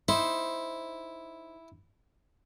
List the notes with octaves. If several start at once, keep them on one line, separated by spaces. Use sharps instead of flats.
D#4 E4 C5